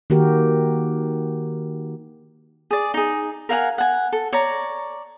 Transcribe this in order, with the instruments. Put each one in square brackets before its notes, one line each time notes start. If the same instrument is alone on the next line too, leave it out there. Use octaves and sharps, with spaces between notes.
[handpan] D#3 A#3 F#4 G4 A#4
[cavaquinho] G#4 D5
D#4 G#4
A#4 F5 F#5 G#5
F#5 G#5
A4
C#5 D5 A#5